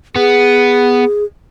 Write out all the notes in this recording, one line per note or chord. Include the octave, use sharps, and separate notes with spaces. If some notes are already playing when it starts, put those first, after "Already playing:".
B3 G#4